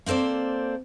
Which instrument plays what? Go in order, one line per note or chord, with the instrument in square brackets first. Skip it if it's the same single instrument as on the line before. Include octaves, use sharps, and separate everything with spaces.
[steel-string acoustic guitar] A#3 C4 A4 C5 D5